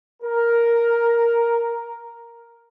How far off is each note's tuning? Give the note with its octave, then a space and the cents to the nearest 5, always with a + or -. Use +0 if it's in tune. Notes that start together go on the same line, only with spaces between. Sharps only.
A#4 +5